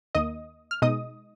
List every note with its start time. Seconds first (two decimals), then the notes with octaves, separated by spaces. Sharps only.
0.15 D#2 D#3 A#3 D#5 D#6
0.71 F6
0.82 B2 G#3 D#4 D#5 D#6